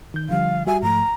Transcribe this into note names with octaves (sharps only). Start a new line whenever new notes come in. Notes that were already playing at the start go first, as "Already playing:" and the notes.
D#3 G6
D3 F3 G3 F5
G3 F#4 E5 G#5
G#2 F3 A3 A#5